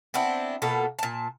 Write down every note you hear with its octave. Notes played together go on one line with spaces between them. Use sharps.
B3 C4 D4 E4
B2 A#3 F4 A4
A#2 A5